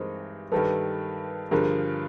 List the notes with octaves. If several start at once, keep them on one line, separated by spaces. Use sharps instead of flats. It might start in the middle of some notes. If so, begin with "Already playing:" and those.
Already playing: G2 E3 G#3 C4 D#4 A#4 C5
G2 D#3 G3 A4 B4
G2 D3 F3 G#4 A#4